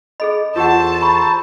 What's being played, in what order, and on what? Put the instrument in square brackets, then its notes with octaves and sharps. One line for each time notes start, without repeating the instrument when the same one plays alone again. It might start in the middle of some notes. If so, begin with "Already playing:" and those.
[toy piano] G#4 A4 B5 [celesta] D#5
[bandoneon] E2 A4 C5 [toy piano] F4 G4 F#5 [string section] A5
[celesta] A#5 B5 C#6